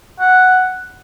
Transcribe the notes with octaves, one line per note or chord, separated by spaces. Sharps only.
F#5